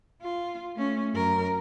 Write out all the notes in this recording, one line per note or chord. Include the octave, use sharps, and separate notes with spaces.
F4
A3 C#4
F#2 A#4